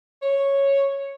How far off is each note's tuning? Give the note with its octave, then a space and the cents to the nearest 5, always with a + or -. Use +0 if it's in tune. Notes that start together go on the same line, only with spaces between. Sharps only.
C#5 -5